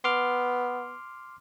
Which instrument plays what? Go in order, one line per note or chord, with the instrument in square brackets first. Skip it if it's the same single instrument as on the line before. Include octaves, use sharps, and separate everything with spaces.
[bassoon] B3 [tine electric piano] C6 D6 F6